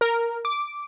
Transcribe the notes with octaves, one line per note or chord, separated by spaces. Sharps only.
A#4
D6